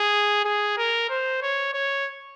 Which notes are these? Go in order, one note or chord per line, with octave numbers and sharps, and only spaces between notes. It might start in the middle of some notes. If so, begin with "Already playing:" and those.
Already playing: G#4
G#4
A#4
C5
C#5
C#5